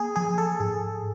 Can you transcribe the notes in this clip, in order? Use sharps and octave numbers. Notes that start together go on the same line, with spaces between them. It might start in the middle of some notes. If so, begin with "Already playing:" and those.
Already playing: A#3 G#4
F3 G#4
A4
G#2 G#4